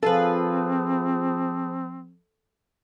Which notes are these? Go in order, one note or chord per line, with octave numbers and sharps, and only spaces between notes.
F3 C4 F4 G#4 A4 B4